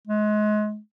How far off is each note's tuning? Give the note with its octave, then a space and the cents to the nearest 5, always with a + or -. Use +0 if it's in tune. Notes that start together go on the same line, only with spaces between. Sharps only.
G#3 +30